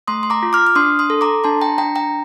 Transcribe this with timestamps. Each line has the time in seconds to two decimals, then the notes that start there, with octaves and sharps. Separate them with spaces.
0.07 A3 C6 D#6
0.23 C6
0.30 A#5 D6
0.43 F4
0.53 D6 F6
0.67 F6
0.75 D4 C6 D#6
0.99 C6 D#6
1.10 A4
1.21 A#5 D6
1.44 D4 A5 C6
1.61 G5 A#5
1.78 D4 G5 A#5
1.96 G5 A#5